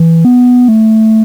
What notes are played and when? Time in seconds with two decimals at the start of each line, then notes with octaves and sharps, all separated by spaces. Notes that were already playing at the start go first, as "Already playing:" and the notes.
Already playing: E3
0.25 B3
0.68 A3